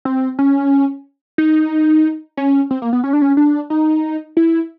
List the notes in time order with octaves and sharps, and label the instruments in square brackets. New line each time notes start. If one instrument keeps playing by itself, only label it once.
[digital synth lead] C4
C#4
D#4
C#4
C4
A#3
B3
C#4
D4
C#4
D4
D#4
E4